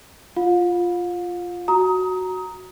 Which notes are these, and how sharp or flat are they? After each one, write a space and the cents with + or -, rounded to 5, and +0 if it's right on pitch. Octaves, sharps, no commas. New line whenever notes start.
F4 +0 F5 +40
F#4 +0 A#5 +0 D#6 +25